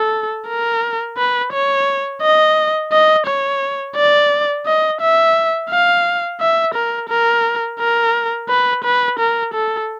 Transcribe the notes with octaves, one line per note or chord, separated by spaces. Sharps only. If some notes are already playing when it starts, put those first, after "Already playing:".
Already playing: A4
A#4
B4
C#5
D#5
D#5
C#5
D5
D#5
E5
F5
E5
A#4
A#4
A#4
B4
B4
A#4
A4